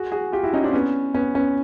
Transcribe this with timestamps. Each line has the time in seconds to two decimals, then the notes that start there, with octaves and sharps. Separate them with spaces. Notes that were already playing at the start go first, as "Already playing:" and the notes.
Already playing: F#4 G#4
0.12 F#4 G#4
0.32 F4 G4
0.43 E4 F#4
0.53 C#4 D#4
0.63 C4 D4
0.73 B3 C#4
1.14 B3 C#4
1.35 B3 C#4